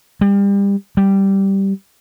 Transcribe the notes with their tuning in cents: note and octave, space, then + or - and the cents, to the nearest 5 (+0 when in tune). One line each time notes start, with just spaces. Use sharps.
G3 +30
G3 -5